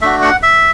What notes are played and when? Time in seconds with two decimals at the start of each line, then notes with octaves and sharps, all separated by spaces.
0.01 A3 D4 F#4 E5
0.22 F#5
0.43 E5